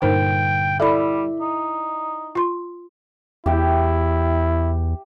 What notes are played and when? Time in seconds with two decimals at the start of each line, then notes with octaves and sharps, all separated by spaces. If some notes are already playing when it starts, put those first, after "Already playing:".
0.02 G2 A#2 D3 D#4 A#4 C5 G5
0.80 G3 E4 A4 D5 E5 B5
1.41 D#4
2.35 F4 C6
3.46 E2 E4 G4 E5 G5